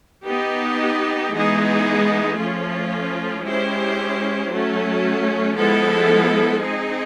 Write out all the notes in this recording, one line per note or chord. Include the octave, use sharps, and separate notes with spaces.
B3 D#4 G4
E3 G#3 B3 D#4 G#4
F3 A3 C#4 F4
G#3 C#4 E4 G4 C5
F#3 A3 C#4
F3 G#3 B3 E4 A4
C4 D#4 G#4